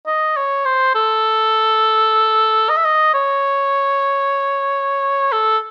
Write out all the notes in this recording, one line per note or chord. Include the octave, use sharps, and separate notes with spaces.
D#5
C#5
C5
A4
D#5
E5
D#5
C#5
A4